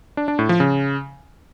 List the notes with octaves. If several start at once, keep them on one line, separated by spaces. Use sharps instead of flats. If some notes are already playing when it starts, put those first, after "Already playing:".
D4
D4
A2
F3
C#3